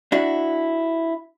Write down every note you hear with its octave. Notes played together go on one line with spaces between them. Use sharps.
D4 E4 F#4